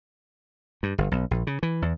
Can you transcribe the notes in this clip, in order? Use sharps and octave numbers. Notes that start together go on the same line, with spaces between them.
G2
G1
B1
A#1
C#3
E3
E2